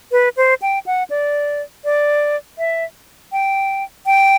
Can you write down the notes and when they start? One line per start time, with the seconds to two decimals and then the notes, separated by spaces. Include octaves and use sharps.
0.12 B4
0.37 C5
0.62 G5
0.86 F#5
1.10 D5
1.84 D5
2.58 E5
3.32 G5
4.06 G5